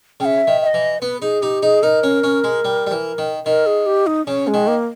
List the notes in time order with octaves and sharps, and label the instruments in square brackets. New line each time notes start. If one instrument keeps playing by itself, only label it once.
[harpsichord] C#3 [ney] G5
[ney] E5
[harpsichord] D#3
[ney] E5
D#5
[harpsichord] E3
[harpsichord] B3 [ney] B4
[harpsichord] D#4 [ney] G#4
[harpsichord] D#4 [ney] G4
[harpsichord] D#4 [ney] G#4
[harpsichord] D#4 [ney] A#4
[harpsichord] C#4
C#4
G#3
G3
G3
E3
D#3
[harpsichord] D#3 [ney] A#4
[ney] G#4
G4
D#4
[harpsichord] C#3 [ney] C#4
[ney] G#3
[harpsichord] D#3
[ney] A#3